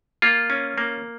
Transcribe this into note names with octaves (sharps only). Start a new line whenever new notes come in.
A#3 F4
C#4
A#3